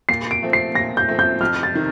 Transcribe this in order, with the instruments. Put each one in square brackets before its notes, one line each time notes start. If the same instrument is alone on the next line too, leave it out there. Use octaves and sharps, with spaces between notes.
[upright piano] A#2 [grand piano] C7
[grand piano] D7
[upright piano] F3 A3 C4
[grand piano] C7
[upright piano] A#2 [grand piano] A#6
[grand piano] G6
[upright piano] F3 A3 C4
[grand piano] G6
[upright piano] F2 [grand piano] F6
[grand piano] A6
[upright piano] C3 D#3